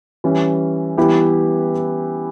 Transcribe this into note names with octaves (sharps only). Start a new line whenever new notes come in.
E3 G3 C#4
E3 G3 B3 E4 G4